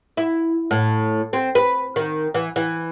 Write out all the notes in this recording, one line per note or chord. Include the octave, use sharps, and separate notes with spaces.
E4
A2
C4
B4
D#3
E3
E3